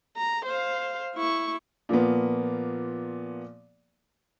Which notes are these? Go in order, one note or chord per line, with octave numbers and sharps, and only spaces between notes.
A#5
C5 F5
E4 C#6
A#2 F3 A#3 B3